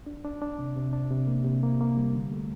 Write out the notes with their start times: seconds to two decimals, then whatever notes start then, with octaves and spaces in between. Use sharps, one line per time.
0.06 D4
0.25 D4
0.42 D4
0.59 C3
0.76 C3
0.93 D4
1.11 C3
1.27 A#3
1.45 C3
1.63 A#3
1.80 A#3
1.97 G3
2.15 D3
2.32 A3